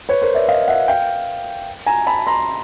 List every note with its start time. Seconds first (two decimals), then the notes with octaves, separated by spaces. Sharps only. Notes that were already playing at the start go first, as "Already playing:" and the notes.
0.09 B4 C#5
0.22 A#4 C5
0.35 D5 E5
0.48 D#5 F5
0.68 E5 F#5
0.88 F5 G5
1.86 G#5 A#5
2.07 A5 B5
2.27 A#5 C6